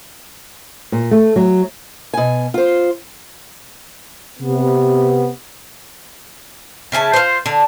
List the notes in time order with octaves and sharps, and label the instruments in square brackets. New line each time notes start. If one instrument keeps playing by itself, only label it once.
[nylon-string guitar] A#2
A3
F#3
[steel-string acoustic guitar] B2 G#5
F4 C5
[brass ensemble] C3 B3
[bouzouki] C#3 E4 G#5 A5
F4 C5
D3